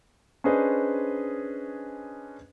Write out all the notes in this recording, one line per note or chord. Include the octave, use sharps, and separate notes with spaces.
C#4 D4 G#4 B4 C5 D#5